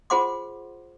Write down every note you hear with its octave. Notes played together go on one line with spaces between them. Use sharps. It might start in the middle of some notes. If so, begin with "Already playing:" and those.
F4 G#4 C5 F#5 C6 D6